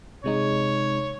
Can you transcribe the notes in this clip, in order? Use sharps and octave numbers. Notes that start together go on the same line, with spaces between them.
C3 G#3 D#4 C#5